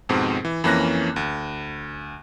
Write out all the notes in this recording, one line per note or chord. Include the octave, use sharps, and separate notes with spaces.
F2 G#2 B2 C4
E3
F2 E3 A#3 C#4 F#6 A#6
D2